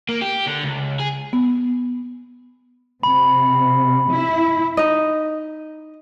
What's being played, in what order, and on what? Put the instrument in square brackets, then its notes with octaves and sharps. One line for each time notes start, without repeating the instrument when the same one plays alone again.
[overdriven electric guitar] A#3
G4
D3
C#2
G#4
[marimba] B3
[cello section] C3 [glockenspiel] B5
[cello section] E4
[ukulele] D#4 D#5